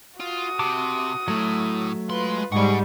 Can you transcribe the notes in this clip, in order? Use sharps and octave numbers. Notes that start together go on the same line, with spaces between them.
F4 F#4 D#6
C3 A5 D6
A2 F#3 A3
G#3 F4 B4 C6
G#2 G3 G#4 D5 F#5 C#6